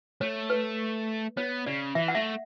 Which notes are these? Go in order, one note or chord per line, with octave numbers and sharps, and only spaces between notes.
A3 C#5
B4
B3 C#5
C#3 D5
E3 E5
F#5
A3 E5